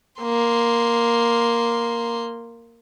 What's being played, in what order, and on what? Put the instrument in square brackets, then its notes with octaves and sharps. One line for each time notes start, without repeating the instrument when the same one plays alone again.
[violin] A#3 C6